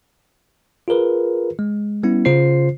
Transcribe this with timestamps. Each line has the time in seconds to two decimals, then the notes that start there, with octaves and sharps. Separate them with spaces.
0.88 F4 G#4 A#4 B4
1.59 G#3
2.03 G3 B3 C#4 E4
2.25 C#3 F4 C5 C7